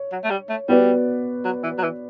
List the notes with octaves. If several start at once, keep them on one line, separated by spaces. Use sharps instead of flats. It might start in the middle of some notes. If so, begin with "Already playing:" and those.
Already playing: C#5
F#3
A3
G3
A3
G3 B3 F#4 B4 D5
F#3
E3
F#3
E3